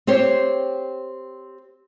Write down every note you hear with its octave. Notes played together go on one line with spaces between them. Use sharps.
C4 G4 C5 C#5